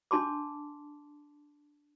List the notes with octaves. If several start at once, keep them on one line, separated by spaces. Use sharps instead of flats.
D4 A5 C6 D6